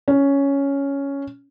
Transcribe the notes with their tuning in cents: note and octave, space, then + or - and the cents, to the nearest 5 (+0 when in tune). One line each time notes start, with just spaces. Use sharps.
C#4 +5